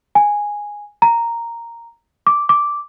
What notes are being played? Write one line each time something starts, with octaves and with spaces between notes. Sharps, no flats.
G#5
A#5
D6
D6